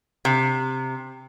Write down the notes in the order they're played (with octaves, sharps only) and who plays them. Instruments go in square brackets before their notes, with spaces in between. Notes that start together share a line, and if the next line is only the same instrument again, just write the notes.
[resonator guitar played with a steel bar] C3